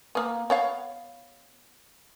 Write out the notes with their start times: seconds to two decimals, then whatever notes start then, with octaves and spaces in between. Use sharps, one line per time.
0.15 A#3 B3
0.50 B3 C#5 F5